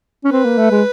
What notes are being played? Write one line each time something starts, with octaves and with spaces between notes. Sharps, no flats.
C#4
C4 B4
A#3
A3
G#3